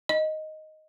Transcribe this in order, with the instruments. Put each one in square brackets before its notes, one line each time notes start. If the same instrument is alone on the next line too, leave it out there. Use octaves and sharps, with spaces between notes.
[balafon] D#5